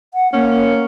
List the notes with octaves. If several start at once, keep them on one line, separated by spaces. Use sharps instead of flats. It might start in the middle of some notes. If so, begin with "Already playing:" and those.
F#5
A#3 C#4